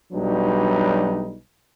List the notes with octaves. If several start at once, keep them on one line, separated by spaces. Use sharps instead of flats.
B1 F#3 G3 D4 D#4 B4